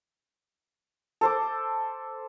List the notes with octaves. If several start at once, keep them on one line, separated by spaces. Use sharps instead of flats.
A4 C5 D6